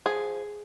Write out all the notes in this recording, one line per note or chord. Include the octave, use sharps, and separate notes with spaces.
F3 G#4